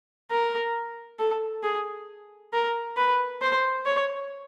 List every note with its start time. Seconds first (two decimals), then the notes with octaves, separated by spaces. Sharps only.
0.30 A#4
1.19 A4
1.63 G#4
2.53 A#4
2.97 B4
3.42 C5
3.86 C#5